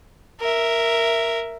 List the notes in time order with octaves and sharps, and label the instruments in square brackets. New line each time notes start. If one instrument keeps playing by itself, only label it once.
[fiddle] A#4 E5